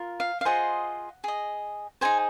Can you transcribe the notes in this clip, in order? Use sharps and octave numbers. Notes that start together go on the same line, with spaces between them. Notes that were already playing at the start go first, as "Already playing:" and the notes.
Already playing: F4 A#4
F5
F5
F4 G#4 C5 D#5 F#5
G#4 D#5
D#4 G#4 C5 G#5